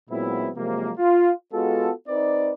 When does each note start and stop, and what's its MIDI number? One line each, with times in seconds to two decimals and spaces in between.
0.10 0.49 46
0.10 0.49 54
0.10 0.49 56
0.10 0.49 59
0.10 0.49 60
0.10 0.49 64
0.56 0.91 48
0.56 0.91 53
0.56 0.91 54
0.56 0.91 56
0.56 0.91 58
0.98 1.31 65
1.52 1.90 56
1.52 1.90 59
1.52 1.90 65
1.52 1.90 66
1.52 1.90 69
2.08 2.52 60
2.08 2.52 63
2.08 2.52 71
2.08 2.52 74